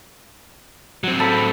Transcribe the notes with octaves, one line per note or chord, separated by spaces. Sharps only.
F#3 C4
A4 B5